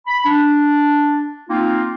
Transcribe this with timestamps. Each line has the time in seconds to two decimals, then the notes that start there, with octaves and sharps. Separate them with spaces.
0.07 B5
0.25 D4
1.49 A#3 C4 D#4 F4